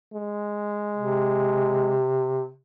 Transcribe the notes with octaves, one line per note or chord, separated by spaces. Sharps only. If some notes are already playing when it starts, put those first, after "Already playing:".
G#3
C3